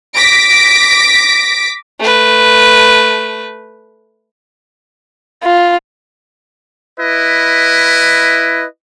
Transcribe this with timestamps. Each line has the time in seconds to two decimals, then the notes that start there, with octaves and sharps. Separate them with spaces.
0.15 D6 A#6 B6 D7
2.00 A3 B4
5.44 F4
6.99 E4 B4 D#5